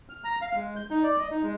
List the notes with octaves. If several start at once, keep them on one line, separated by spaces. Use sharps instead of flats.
F6
A#5
F5
G#3
G6
D#4
D5
D#5
D#4
G#3